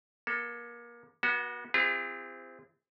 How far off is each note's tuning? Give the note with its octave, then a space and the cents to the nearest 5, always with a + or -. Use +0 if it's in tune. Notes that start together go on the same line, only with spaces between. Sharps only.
A#3 +30 A4 +5
B3 -40 F#4 +0
C4 -20 F4 -45 G#4 -45